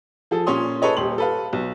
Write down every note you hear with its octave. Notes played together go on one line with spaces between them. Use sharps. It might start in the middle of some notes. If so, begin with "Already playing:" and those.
F3 G#4 A4
A#2 C#4 C#5 C6 D#6
G#4 A4 B4 C#5 D#5
D#1 G4 C6 F#7
A4 B4 F5
B1